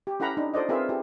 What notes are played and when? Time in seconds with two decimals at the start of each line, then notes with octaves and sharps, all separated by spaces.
0.07 G4
0.20 C#4 E4 A4 F#5 A#5 B5
0.37 D4 D#4
0.54 F4 A4 C5 D5 D#5
0.69 C4 F4 G#4 A#4 B4 E5
0.89 E4 G4 A4